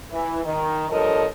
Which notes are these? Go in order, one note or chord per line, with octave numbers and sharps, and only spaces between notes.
E3
D#3
G2 F3 A4 A#4 C#5 D#5